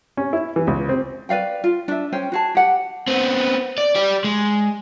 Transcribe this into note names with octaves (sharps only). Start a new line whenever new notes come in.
C#4
E4
E3
C#2
C4
B4 D5 F5 G5
F4
D4 E5
C#4 C5 G5
F#4 G#4 A5
G4 F#5
B3 C4
D5
G4 D5
G#3